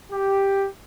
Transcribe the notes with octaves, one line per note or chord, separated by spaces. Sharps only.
G4